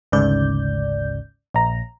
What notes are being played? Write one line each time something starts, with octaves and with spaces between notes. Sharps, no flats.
G#1 D2 G#2 C#3 D5 G6
A#1 A#5